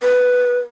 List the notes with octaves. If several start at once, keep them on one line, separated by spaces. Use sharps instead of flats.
B4